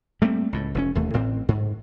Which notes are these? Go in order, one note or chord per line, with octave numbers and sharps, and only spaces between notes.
G3 A3 A#3 C4
C#2 A2
F1 A#2 C#4
E1 D#2 A3
A1 A2 C4
G#2